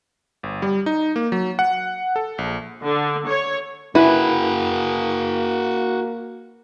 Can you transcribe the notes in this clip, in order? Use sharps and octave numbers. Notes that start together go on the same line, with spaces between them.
G1
G3
D#4
A#3
F#3
F#5
A4
A#1
D3
C#5
A#3 E4 F#4 G#4 B4